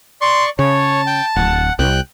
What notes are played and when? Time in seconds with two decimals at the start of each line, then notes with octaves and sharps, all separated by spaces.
0.21 D5 C6 C#6
0.59 C#3 C#5 A5
1.07 G5
1.36 D1 F#5
1.79 C2 G5 F#6